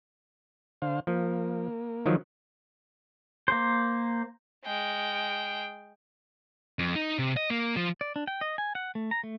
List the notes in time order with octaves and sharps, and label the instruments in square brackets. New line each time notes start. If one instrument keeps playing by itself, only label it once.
[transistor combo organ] D3 C5 F5
[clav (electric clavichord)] F3 [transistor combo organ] A#3
[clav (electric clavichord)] D#3 F3 F#3
[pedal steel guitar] A#3 C5
[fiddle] G#3 G5
[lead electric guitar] F2
D#4
C3
D#5
A#3
F3
[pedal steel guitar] D5
D4
G5
D#5
G#5
F#5
A3
A#5
A3